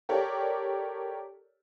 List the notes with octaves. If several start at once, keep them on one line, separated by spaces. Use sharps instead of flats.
G4 A4 A#4 C#5 D5